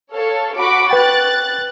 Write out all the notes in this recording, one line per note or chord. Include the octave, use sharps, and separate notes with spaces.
A4 C#5 F5
F#4 B5 D6
B4 G5 F#6 A6